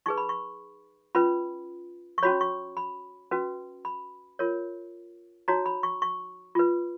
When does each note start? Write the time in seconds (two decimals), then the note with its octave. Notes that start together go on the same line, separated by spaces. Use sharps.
0.06 D#4 G#4 B4 C#6
0.17 B5
0.29 C#6
1.15 C#4 F4 B4 B5
2.18 C#6
2.23 C#4 F#4 C#5 B5
2.41 C#6
2.77 B5
3.31 C#4 F#4 B4
3.85 B5
4.39 F4 A#4 C#5
5.48 D#4 F#4 C#5 A#5
5.66 B5
5.83 C#6
6.02 C#6
6.55 F4 B4